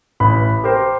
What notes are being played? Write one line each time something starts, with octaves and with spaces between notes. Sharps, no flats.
A1 B4 B5
G4 A#4 C5